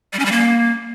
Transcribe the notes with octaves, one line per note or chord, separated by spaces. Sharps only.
G3
C#4
G3
A#3